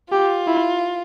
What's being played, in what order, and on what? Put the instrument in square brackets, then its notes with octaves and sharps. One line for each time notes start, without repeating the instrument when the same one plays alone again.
[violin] F4 [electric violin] G4
[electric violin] E4